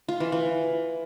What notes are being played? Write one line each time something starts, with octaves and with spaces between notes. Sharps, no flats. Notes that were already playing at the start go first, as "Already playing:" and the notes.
F4
E3
E3